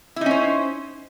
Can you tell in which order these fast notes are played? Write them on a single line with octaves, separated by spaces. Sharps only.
E4 D#4 C#4 C5